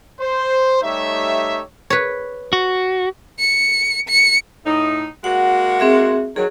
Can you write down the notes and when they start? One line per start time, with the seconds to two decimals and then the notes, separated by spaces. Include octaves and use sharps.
0.20 C5
0.82 G3 A3 D#4 G4 C#5 E5
1.90 B4 C#5
2.53 F#4
3.39 C#7
4.08 C#7
4.66 A2 D#4
5.24 G#3 A#3 F#4 F#5
5.80 C4 G#4 E5
6.36 D#3 F#3 G#4